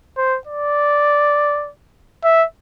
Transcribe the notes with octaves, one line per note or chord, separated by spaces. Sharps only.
C5
D5
E5